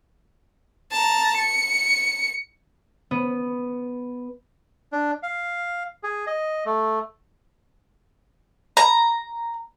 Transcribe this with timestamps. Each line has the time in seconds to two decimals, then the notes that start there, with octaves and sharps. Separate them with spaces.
0.92 A5 A#5
1.37 C#7
3.11 B3
4.92 D4
5.23 F5
6.03 G#4
6.27 D#5
6.66 A3
8.77 A#5